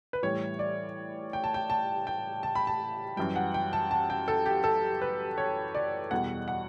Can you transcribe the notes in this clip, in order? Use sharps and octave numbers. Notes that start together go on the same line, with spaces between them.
B4
A2 E3 G3 C#5
D5
G5
A5
G5
A5
G5
A5
B5
A5
F#2 E3 G3 G5
F#5
G5
A5
A5
G5
A4
G4
A4
B4
C#5
D5
E2 B2 G3 F#5
F#5